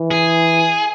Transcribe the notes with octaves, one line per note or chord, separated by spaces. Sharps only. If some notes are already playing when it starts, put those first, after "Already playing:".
Already playing: E3
G#4